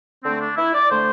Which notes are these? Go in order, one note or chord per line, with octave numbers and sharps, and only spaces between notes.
D3 A3 C4
D4
E4
D5
D3 A3 C5